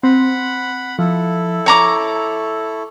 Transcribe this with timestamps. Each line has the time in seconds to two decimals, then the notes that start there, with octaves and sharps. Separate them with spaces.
0.03 C4 F#5 B5
0.99 F3 E4 A4
1.66 C#5 A#5 C#6 D6